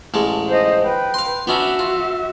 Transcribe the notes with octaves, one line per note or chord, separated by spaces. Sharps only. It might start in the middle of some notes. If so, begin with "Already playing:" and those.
A1 G#3 A4
C5 D#5
B4 G5
F5 C6
B3 C#4 D4 F#4 E5
F4